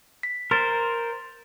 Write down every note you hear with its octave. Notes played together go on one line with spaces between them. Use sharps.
B6
A#4 C5 C6 A6